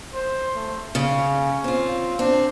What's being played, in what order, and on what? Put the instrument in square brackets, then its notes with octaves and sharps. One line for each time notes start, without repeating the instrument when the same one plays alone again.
[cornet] C5
A3
[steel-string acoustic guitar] C#3 [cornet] C#4
[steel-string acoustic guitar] C4 F4
[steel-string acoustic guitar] C4 [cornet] D4